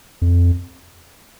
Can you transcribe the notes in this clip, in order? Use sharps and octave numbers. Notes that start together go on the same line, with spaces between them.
F2